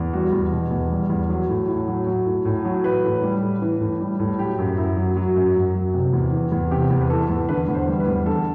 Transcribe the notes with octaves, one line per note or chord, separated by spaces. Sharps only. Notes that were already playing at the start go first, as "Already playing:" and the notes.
Already playing: E2
G3 F#4
E2
B2
E2
G3
E2
F#3
A2
A2
F#3
F#3
A2
A2
F#3
E3 B4
A2
G3
A2
E3
A2
G3
A2
F#3 G4
F#2
F#2 E4
F#3
F#3 F#4
F#2
F#2
F#3
C3
E2
E3
E2
C3 G4
E2
B4
E3 A4
E2
D3 B4
E2
C5
G3
B4
E2
D3 A4